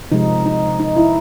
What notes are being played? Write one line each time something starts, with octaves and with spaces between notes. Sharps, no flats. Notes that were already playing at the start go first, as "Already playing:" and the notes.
C3 F3 G#3 D#4
D#4
D#4
E4